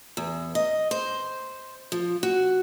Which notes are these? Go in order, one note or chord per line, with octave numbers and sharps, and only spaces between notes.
E2
D#5
C5
F3
F#4